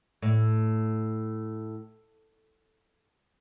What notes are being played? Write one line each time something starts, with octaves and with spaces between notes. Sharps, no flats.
A2